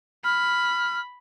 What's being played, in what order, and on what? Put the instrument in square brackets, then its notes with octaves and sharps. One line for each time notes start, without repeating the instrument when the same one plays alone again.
[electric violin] B5 [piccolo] F6